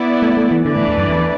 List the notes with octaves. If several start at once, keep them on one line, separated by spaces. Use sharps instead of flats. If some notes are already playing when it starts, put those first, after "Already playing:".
Already playing: B3 E4 D5
A3
A3
E3
D3 E3 A3 D4 B4 D5
A2
E2
F#2
E2